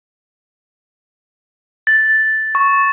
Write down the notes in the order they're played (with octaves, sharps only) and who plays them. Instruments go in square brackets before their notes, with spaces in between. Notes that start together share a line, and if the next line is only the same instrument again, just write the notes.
[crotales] A6
C#6